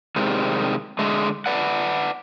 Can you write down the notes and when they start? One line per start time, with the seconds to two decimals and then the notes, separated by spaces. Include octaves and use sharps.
0.16 C3 D#3 G3 G#3
0.99 D3 G#3 A3
1.46 B4 D5 F#5